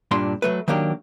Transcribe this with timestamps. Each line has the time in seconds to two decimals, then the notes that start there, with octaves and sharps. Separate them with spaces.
0.11 G2 A#2 D4 C6
0.42 F#3 A3 B4
0.68 D#3 F#3 A#3 D4 G4